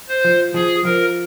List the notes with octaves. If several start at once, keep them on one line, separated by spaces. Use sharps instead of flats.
C5
F3
F3 G#4
F3 A#4